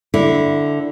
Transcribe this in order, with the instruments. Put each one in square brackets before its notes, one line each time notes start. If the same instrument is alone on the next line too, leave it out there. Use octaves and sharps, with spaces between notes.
[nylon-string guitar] D3 E4